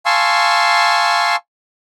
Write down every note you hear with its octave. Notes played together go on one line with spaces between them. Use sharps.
F5 G#5 A5 C6 C#6 E6